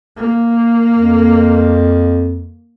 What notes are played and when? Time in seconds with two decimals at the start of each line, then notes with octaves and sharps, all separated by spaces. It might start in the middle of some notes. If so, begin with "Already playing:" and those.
0.17 A#3
0.98 F2